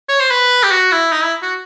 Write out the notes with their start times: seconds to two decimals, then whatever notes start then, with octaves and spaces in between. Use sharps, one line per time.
0.09 C#5
0.20 C5
0.31 B4
0.63 G4
0.71 F#4
0.92 E4
1.12 D#4
1.22 E4
1.42 F#4